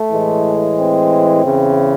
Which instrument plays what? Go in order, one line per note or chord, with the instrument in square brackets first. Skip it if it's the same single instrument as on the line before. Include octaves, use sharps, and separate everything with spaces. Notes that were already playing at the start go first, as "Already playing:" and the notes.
Already playing: [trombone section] A3
A2 E3 G#3
C4
E2 C#3 E3